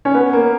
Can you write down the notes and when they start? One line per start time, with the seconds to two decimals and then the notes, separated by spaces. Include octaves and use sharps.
0.05 C#4
0.14 B3
0.33 A#3